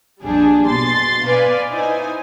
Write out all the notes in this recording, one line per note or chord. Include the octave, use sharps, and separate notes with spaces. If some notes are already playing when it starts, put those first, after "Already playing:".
A#1 F2 G3 D4 G#4
B2 C6 A6
B4 D5 F5 G#5
D#4 E4 C5 G#5